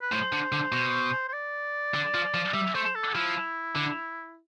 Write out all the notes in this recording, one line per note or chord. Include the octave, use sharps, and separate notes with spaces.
B4
A2 C5
D3
D3
B2
C5
D5
D3
F3
F3
G3 E5
A3 C5
A4
F3 E4
D3